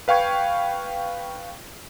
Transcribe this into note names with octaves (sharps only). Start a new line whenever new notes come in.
B4 F5 G5 C#6 G#6